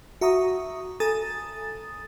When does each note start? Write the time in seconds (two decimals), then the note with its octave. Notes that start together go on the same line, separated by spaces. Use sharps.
0.21 F#4 E5 A#5 C#6 D#6
1.00 A4 G#5 A#5 D#6 A6